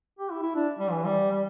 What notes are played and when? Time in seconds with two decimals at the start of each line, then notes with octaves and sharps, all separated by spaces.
0.19 G4
0.31 E4
0.43 E4
0.56 D4
0.79 G3
0.91 E3
1.05 G3
1.31 G3